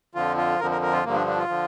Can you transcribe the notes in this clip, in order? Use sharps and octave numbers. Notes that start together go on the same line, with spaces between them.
F2 D3 F3 F4
F4
F2 D3 F3 A#4
A#4
A#4
F4
G2 D3 F3 A#3
D4
D4
F4
D3 F3